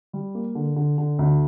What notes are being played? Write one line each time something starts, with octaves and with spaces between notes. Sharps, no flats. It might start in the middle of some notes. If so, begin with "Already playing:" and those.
G3
A#3
D3
D3
D3
D2